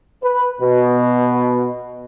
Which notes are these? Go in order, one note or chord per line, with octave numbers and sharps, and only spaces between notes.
B4
B2